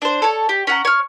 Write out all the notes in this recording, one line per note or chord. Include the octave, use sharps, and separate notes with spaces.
D4 C5
A4 C#5
G4
C#4 F#5 A#5
C#5 F6